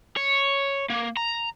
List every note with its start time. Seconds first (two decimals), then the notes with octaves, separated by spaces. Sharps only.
0.16 C#5
0.90 A#3
1.17 A#5